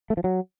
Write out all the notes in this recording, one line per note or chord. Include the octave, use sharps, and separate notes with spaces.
A3
F3
F#3